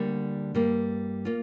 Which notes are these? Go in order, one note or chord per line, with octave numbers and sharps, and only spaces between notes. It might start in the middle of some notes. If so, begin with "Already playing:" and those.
Already playing: D2 D3 G3 A#3
G2 G3 A#3
A#3 F4